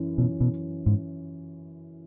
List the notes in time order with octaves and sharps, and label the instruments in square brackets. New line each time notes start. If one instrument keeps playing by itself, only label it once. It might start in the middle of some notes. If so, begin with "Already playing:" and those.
Already playing: [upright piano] F#2 E3 C#4
[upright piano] F#2 E3 C#4 [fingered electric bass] B2
[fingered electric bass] B2
G#2